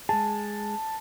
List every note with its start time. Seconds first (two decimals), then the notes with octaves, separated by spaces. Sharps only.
0.09 G#3 G#4 A5